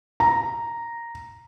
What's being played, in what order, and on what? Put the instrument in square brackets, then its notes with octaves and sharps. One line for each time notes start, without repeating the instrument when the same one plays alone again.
[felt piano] A#5